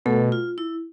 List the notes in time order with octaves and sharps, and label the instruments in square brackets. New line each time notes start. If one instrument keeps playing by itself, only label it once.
[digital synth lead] B2 [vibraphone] A3 A4
[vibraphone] F4
E4